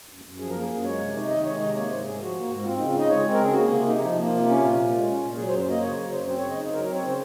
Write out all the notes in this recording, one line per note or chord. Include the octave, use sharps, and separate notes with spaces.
F#2
F#2
F3 G#4
A#3 A#4
G#4
F#2
G#3 C#5
C3
D#4
D#3 D#5
G#3 C#5
C3 D#5
A#3 C#5
G#2 C5
G#2 G#4
F3 F#4
A#3
G#2
C4 F4
D#4
C#3
F4
D#4 D#5
G#3 C#5
C4
A#4
C#3 G#4
A#3 F#4
G#4
C3
D#4
F3 D#4
A#3
F4
C3
C#4
A#2
A#2
G#3
C#4
A#2
F#3 G#4
C5
F#2
C5
A#3 D#5
C#3 C#5
F#3
F#2 C5
C4 C5
C#5
C#3
D#5
D#4
F#3 A#4
A#4
C4
C#5
C#3 C5